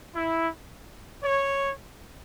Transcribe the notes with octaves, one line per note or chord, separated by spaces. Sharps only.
E4
C#5